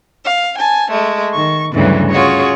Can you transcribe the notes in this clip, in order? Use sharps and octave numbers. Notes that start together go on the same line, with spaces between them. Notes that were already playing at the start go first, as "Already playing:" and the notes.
F5
G#5 A5
G#3 A3
D#3 C#6
D2 G2 C#3 E3 F#3
C#4 F4 F#4 G#4 C#5